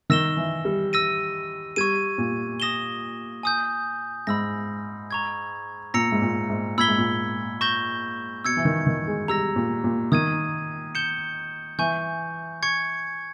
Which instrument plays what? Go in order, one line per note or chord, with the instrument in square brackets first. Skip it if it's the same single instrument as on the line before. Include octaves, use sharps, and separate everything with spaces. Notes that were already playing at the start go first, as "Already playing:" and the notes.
[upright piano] D#3 [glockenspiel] E6 A#6 E7 G7
[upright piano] E3
G3
[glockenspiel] E6 A#6 D#7
[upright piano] G3 [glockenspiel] C#6 G#6 D#7
[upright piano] A#2
[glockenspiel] D#6 A#6 E7 G7
G#5 D#6 G6
[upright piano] G#2 [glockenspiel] B5 E6 A#6
[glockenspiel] A#5 C#6 G#6
[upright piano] A#2 [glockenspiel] A#5 E6 A#6 C#7
[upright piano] G#2
A#2
G#2
[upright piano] A#2 [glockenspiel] B5 E6 G#6 B6 G7
[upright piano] G#2
A#2
[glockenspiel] C#6 G6 A#6 E7 G7
[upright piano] B2 [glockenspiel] E6 G#6 C#7
[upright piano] E3
D#3
D#3
G#3
[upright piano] G3 [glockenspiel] A#5 E6 A#6
[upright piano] A#2
A#2
[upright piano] D#3 [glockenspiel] D#6 G#6 D#7
[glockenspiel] G6 C#7 E7 G7
[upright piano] E3 [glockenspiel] G#5 C#6 G6
[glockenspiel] C#6 G#6 C#7